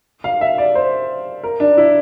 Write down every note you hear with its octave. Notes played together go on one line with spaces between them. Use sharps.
F5
E5
D5
C5
A#4
D4
E4